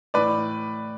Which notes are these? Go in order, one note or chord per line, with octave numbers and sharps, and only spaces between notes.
A2 E3 B4 D5